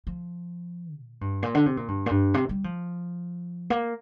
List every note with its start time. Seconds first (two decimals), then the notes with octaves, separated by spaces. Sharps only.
0.07 F3
0.98 A#2
1.21 G2
1.43 A#2
1.54 D3
1.66 C3
1.77 A#2
1.88 G2
2.06 A#2
2.11 G2
2.34 C3
2.49 G3
2.64 F3
3.70 A#3